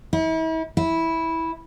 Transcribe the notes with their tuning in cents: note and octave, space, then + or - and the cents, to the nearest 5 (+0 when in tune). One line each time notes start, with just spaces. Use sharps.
E4 -40
E4 -10